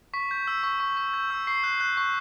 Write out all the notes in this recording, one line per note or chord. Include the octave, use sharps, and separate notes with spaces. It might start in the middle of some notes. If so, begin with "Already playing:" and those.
C#6 B6
G6
E6
C#6
C#6
C#6
G6
E6
C#6 C7
F#6
F#6
C#6